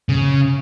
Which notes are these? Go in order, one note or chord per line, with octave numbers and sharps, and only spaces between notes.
C#3